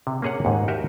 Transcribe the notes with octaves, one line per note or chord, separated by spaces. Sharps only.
C3
A#3 C#4 G#4 C#5 F#5
D#2 G#2
F#4 G4 A#4 D#5 E5